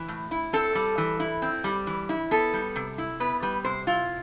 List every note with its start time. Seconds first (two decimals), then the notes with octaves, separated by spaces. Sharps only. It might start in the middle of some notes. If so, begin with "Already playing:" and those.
Already playing: E3
0.08 A2
0.31 E4
0.53 C4 A4
0.75 G3
0.98 E3
1.20 E4
1.42 C4
1.64 G3
1.87 E3
2.09 E4
2.31 B3 A4
2.53 G3
2.76 C3
2.98 E4
3.20 B3 B4
3.42 G3 B4
3.65 C3 C5
3.87 E4 F4